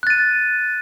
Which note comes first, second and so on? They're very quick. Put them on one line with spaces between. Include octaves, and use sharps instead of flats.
F#6 A6 D#7